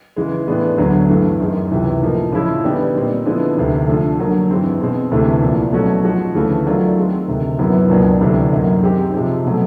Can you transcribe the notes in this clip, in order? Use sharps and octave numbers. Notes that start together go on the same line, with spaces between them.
C#3 E3 G#3
A2 E3 G#3 B3 D4
D2 D3 F#3 B3
G2 E3 A3
F#2 D#3 G#3
C#2 C3 E3
A2 F3 A#3 D#4
C#3 F3 G#3 C#4 E4
D3 G3 B3 D#4 G4
A#2 G3 C4 D#4
D3 F3 G#3 B3 E4
D2 C3 D#3
D3 F3 A3
D3 F#3 A#3
G2 E3 G#3 C4 D#4
B2 G#3 C4
D2 C3 E3 A3
C2 A#2 F3
B2 F#3 A3 C#4 F#4
G#2 F3 G#3 C#4 F#4
D2 C#3 E3 A3
D#3 F#3 A3 D4 F4
D#3 G#3 C4
D2 C3 D#3
F#2 D#3 F#3 B3 E4
C#2 B2 F#3 A#3 D4
D2 C3 E3 G3
F#2 D#3 F#3 A#3 D#4
D#3 G#3 C4 D#4 G4
C3 F3 G#3 C4
B2 F#3 A3